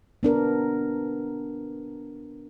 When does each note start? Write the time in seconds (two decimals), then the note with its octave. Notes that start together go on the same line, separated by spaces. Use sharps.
0.23 B3 D4 A#4